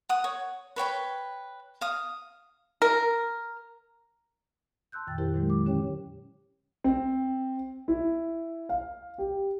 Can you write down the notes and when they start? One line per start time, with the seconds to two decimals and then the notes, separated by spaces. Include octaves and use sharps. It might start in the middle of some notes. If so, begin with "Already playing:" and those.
0.09 F#5 D#6
0.24 C#5
0.76 B4 C#5 G5 B5
1.81 F5 D#6
2.82 A#4
4.92 A5 C6 E6 F#6 G6
5.07 F2 A#2 D#3 G5 A6
5.18 E4 G4 A#4 C5
5.33 A#2 D#3 F#3 G#3
5.50 D6
5.65 D#2 D3 C#4 G4 C#5 G5
6.84 C4
7.88 E4
8.69 F5
9.18 G4